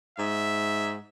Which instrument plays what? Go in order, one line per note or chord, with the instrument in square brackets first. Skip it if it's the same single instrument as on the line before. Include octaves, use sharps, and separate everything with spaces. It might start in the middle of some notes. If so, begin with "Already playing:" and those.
[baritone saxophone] G#2 [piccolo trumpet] E5